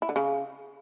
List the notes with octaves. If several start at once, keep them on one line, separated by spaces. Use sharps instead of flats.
E4
D3
C#3